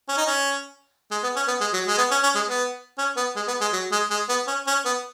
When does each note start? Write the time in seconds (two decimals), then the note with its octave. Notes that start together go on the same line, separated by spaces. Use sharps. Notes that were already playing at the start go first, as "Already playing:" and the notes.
0.09 C#4
0.17 D#4
0.27 C#4
1.11 G#3
1.23 B3
1.36 C#4
1.48 B3
1.61 G#3
1.73 F#3
1.87 G#3
1.98 B3
2.11 C#4
2.23 C#4
2.35 G#3
2.49 B3
2.98 C#4
3.16 B3
3.36 G#3
3.48 B3
3.61 G#3
3.73 F#3
3.92 G#3
4.10 G#3
4.29 B3
4.47 C#4
4.67 C#4
4.85 B3